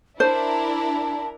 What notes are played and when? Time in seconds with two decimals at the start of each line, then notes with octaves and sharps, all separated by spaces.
0.20 D4 E4 A#4 C5 A5